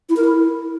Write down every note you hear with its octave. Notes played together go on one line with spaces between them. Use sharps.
E4
A#4
E4